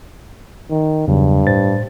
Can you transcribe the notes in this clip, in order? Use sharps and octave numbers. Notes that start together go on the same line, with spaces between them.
D#3
E2 G2 C#3 F#3
A2 C5 A6